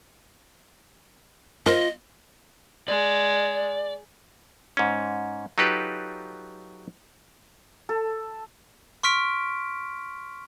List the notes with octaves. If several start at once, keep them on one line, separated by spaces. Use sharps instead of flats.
F4 A#4 C5 D#5
G#3 D5
G#2 C#4
F#3 D#4 F4 G4 A4 B4
A4
C6 C#6 F6 B6 D7